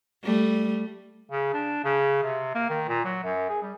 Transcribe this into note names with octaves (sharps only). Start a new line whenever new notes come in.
G3 A3
C#3
D4
C#3
C3
A#3
D#3
A#2
F#3
F#2
G#4
G3